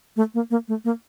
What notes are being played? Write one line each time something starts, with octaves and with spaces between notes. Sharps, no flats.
A3
A#3
A#3
A3
A#3